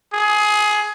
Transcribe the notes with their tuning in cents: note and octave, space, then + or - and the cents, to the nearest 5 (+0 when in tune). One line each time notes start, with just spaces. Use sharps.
G#4 +20